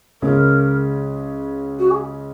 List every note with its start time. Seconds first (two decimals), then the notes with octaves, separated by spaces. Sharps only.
0.22 C#2 C#3 G#3 C#4 A#4
1.79 F#4
1.90 G#4